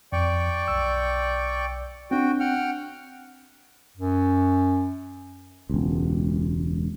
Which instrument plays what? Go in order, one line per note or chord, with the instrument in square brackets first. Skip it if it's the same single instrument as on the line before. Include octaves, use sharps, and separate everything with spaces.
[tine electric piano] F2 [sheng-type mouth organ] D5 G5 C#6
[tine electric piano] B1 E6
[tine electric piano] C4 D4 [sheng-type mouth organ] F#4 G5
[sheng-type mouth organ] F#5 G5 F6
[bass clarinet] F#2
[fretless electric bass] E1 C#2